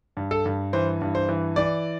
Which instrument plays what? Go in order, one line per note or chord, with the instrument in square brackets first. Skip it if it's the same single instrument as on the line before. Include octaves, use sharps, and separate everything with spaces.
[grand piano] G2
A4
G2
E3 C5
G2
C5
E3
E3 D5